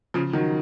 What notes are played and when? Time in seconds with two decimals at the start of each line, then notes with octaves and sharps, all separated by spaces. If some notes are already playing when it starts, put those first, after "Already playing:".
0.14 C#3 F3
0.33 D#3 F#3